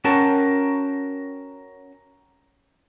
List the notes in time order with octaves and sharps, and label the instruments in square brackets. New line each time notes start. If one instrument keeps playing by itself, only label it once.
[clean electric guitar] C#4 F#4 A#4 G5 A5